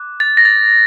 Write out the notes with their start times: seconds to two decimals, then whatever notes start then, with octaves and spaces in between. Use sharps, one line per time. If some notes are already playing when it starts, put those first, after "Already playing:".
Already playing: D6 F#6
0.20 A6
0.37 A#6
0.45 A6